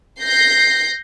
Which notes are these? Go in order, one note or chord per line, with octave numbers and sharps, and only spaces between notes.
G6 A#6 C7